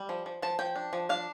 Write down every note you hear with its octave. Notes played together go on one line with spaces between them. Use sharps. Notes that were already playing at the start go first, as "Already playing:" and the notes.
Already playing: G3
F3
F3
F3 A5
F3 G5
D4
F3
D4 F5